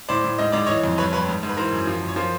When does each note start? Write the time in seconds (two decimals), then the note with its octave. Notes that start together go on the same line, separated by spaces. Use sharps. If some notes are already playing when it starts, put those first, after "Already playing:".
0.09 A2 C5 D5
0.24 A2
0.38 G#2 D#5
0.52 G#2 D5
0.66 E3 C#5 D#5
0.84 F2
0.98 G2 B4 C#5
1.12 G2 B4 C#5
1.28 G#2
1.43 G#2
1.50 B4
1.57 E3 A#4 C5
1.72 F#2
1.87 F3
2.02 F#2
2.08 C#5
2.16 F3 A#4 C5